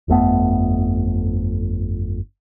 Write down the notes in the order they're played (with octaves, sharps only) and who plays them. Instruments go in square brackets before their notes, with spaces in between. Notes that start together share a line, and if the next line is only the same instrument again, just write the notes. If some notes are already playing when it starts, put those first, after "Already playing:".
[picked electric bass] G1 F2 A3 B3